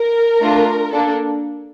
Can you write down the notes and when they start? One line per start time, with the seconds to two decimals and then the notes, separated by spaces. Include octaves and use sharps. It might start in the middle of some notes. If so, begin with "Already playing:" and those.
Already playing: A#4
0.41 A3 D4 F4
0.92 A#3 D4 A4